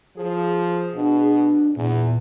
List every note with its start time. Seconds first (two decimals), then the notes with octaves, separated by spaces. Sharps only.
0.17 F3 G#4
0.95 B2 D4
1.76 E2 A#2 B3